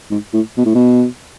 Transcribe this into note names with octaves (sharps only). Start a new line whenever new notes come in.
G#2
A2
B2
A2
B2